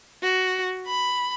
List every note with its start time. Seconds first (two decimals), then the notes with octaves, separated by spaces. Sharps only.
0.22 F#4
0.86 B5